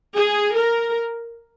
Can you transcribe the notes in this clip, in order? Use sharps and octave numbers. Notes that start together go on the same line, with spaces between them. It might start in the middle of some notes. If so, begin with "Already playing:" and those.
G#4
A#4